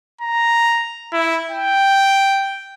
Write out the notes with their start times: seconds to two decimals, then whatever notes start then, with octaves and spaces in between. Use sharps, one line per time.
0.21 A#5
1.13 E4
1.51 G5